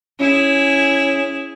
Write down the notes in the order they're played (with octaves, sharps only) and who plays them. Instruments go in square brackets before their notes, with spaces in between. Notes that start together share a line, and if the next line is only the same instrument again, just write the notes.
[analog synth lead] C#4 [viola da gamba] E4 G#4